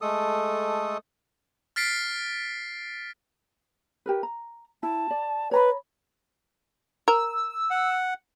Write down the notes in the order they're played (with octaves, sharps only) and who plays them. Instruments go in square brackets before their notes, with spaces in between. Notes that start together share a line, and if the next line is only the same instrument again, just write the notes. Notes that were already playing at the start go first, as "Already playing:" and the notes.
[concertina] G#3 A3 A4 D#6
[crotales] F6 A6 B6 C7 D7
[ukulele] G4 A#4 B4
A#5
[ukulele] E4 [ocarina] A5
[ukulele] D5
[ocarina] B4 [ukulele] C#5 A#5 B5
[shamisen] A#4 [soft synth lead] E6
[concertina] F#5